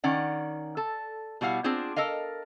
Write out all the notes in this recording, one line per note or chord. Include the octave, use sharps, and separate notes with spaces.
D#3 C#4 D5 F#5
A4
B2 G3 E4 F5 F#5
C4 D4 F4 G#4 C5
A4 A#4 D#5 F5